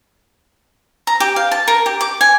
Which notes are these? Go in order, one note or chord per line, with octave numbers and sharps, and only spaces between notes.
A#5
G4
F5
A5
A#4
G4
D6
G#5